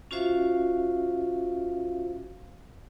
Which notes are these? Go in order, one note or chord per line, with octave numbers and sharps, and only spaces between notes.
C#4 F4 F#4 C5 E5 F5